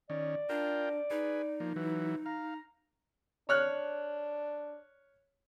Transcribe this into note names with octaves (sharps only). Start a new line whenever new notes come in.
D#3 C#4 D5
D4 F4 A#4 G5
D#4 G#4 B4
F3 A#3
E3 F#3 B4
F5 A#5
D4 C#5 F6 F#6